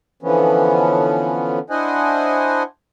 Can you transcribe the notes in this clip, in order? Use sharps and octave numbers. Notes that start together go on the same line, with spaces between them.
D3 E3 F3 B3 C#4
D4 E4 C5 D#5 F#5 G#5